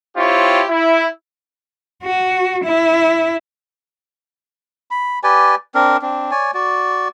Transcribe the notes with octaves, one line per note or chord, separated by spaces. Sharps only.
C4 E4 F4 G4 C#5
E4
F#4
E4
B5
G4 B4 D5 G#5
C4 D4 A#4
C4 D4
C#5 D5 G#5
F#4 D5